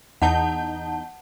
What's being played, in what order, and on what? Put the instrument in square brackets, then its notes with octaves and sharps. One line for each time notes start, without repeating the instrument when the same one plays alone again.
[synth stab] E2 D#4 G6 [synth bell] F#5 A5